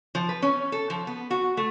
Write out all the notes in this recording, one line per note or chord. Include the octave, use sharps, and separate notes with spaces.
F3
B4
C#4
A4
F3
B3
F#4
A3